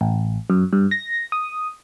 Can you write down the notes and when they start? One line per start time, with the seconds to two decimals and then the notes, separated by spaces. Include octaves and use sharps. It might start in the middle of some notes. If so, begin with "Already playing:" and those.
0.01 A1
0.50 F#2
0.73 G2
0.91 A#6
1.32 D#6